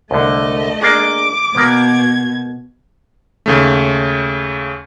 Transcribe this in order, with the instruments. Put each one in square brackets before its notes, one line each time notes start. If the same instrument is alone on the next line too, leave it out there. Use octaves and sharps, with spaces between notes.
[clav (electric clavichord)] C2 D3 [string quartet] A3 D#5
[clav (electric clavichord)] A#3 D4 G#4 [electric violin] D6
[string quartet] B2 G#6 [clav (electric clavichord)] A#3 B3
[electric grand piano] D#2 C#3 A3